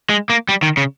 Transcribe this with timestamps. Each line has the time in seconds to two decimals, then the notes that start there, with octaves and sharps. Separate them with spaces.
0.10 G#3
0.30 A#3
0.49 G3
0.63 D#3
0.77 C#3